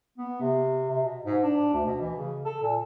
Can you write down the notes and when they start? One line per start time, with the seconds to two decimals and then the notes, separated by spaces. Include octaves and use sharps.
0.18 B3
0.41 C3
0.90 C3
1.04 B2
1.24 G#2
1.43 D4
1.73 D2
1.86 B2
2.01 E3
2.18 C#3
2.45 A4
2.63 A#2